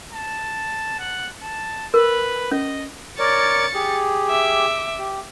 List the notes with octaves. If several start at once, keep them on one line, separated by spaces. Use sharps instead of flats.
A5
F#5
A5
A#4 B4
C#4 D#5
A#4 C#5 D5 A6 C#7
G4 G#4
E5 D6
G4